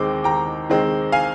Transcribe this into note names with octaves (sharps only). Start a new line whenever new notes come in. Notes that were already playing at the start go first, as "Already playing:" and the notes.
Already playing: D#2 D#3 G#3 C4 D6
D#2 G5 A#5
D#3 G#3 C4
F5 G#5